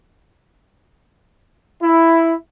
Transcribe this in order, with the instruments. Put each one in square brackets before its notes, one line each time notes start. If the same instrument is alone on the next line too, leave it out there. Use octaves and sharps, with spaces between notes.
[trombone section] E4